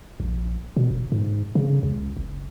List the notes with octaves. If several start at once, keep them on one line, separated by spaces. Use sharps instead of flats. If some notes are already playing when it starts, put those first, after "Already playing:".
A#1
B2
F#1
G#2
C#3
C#2
F#1